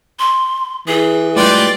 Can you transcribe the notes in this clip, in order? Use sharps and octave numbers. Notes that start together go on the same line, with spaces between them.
C6
E3 G#4
A2 G3 G#3 F4 G4 B4 D5